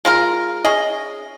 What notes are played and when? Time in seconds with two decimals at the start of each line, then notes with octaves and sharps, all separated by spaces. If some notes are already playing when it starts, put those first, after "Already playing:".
0.05 G#3 F4 A#4
0.64 C#4 G#4 D#5